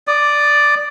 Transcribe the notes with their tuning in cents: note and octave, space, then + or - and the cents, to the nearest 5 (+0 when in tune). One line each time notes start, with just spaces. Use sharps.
D5 +0 D#6 -30